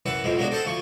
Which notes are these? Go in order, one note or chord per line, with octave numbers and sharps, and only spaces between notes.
F#2 E3 B4 E5 F#5
B1 F2 G#2 B2 G#3 C4
F#3 G#3 A#3 B3 D4 F#4
C4 A4 C5 D#5 F#5 A5
D2 F3 F4 C#6